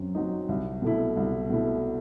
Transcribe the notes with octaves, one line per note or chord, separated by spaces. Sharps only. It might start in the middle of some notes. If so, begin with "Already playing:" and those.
Already playing: F#2 F#3 C4
F#3 C4 D#4
C2
B2 A3 E4
C2
B2 A3 E4